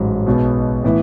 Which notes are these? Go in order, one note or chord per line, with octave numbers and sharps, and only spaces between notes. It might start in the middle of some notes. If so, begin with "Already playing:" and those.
Already playing: A1 G#2 F#3
B1 B2 G#3 B3
A2 E3 B3 E4